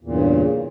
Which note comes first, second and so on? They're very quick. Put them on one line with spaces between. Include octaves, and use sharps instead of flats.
E2 A#2 G2 C#3